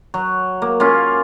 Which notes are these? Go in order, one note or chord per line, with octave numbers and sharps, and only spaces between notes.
F#3
A#3
A#3 C#4 F4